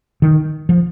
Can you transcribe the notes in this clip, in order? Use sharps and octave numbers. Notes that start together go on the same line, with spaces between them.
D#3
F3